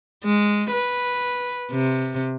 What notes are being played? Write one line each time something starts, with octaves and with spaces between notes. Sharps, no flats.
G#3
B4
C3